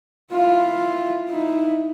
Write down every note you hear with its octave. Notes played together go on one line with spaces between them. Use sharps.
E4 F4
D#4 E4